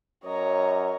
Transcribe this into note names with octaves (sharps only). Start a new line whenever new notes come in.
F#2 C#5 D#5 A#5